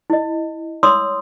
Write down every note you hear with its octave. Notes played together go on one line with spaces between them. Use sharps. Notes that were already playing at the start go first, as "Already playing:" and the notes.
E4 D#5
C#5 C6 D#6 E6